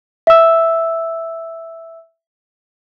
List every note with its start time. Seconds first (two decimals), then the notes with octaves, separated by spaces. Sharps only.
0.27 E5 E6